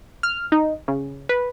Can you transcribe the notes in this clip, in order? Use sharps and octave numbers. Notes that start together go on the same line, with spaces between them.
F6
D#4
C#3
B4